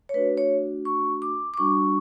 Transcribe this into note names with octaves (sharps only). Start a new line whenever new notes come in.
C#5
A3 D4 F#4 B4
C#5
C#6
D6
D6
G3 D4 F#4 C#6